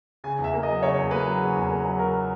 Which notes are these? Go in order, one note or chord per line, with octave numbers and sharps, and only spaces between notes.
C#3 G#5
E2
E5
A#3
D#5
F#3
C#3 C#5
E2
A#3 B4
F#3
C#3
E2
A#3
F#3
C#3 A#4